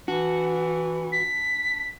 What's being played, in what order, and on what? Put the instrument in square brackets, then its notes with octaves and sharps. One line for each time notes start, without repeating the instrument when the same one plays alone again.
[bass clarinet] E3 [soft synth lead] D4 [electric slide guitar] F#4
[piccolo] B6